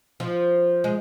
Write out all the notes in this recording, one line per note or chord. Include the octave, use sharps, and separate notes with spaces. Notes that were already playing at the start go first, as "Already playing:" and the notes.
F3
G#3